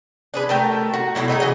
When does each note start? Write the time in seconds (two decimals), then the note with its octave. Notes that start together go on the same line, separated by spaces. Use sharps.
0.34 D4 G#4 B4
0.49 A3 G4 A#4 A5
0.93 F#4
1.15 B2 A3 A#3 E4
1.28 A3 D#4 G4 G#4
1.40 C#3 E3 F#4 D#5